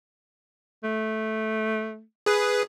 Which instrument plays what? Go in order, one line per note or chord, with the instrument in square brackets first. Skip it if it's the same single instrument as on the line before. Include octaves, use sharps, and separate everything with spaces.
[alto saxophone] A3
[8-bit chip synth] G#4 B4